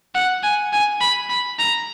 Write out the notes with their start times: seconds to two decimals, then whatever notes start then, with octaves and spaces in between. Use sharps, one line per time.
0.15 F#5
0.43 G#5
0.73 G#5
1.01 B5
1.30 B5
1.59 A#5